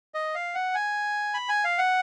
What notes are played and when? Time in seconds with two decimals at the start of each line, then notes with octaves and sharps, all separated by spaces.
0.14 D#5
0.35 F5
0.55 F#5
0.75 G#5
1.34 B5
1.49 G#5
1.64 F5
1.78 F#5